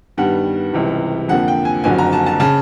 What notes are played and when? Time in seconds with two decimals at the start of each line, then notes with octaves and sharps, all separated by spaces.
0.17 G2 D#3 G3 B3 F#5
0.73 C#2 C3 E3 G3
1.28 F2 D3 F3 A#3 F#5
1.48 G5
1.65 G#5
1.84 F#1 F2 D3 F#3 G#5
1.98 A#5
2.13 A5
2.26 A5
2.40 C#3 A5